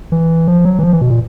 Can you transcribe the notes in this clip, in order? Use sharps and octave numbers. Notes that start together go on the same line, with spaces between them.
E3
F3
F#3
E3
F3
E3
B2
A#2